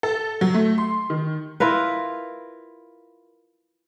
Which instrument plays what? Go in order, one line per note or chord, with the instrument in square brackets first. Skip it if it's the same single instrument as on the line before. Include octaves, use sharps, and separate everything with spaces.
[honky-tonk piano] A4
F#3
A3
C6
D#3
[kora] E4 F4 A#4 B4